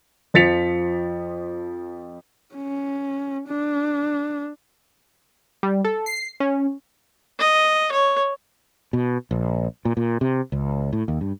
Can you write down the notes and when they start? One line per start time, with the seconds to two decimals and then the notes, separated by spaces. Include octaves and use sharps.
0.34 F2 F3 A6 B6 C#7 F7
2.55 C#4
3.48 D4
5.63 G3
5.85 A4
6.06 C7
6.40 C#4
7.39 D#5
7.92 C#5
8.93 B2
9.31 A#1
9.85 A#2
9.97 A#2
10.21 C3
10.52 C#2
10.93 A2
11.08 D#2
11.21 G2